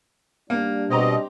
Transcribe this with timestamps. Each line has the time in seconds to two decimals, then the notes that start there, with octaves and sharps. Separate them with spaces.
0.50 G3 A#3 D4
0.90 B2 C4 G4 D#5 A#5